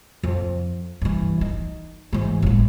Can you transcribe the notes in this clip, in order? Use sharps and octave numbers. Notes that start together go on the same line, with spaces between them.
F2
G2 E3
D#4
G#2 E3
G1 A2